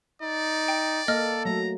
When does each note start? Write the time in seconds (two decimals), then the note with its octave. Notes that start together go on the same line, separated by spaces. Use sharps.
0.22 D#4 D5
0.68 G5
1.08 A#3 A4 D#5 F6
1.45 F#3 A3 A#5